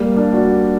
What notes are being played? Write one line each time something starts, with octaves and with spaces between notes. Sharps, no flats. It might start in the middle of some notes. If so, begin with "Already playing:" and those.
Already playing: G3 A#3
A#3 D4
D4 F#4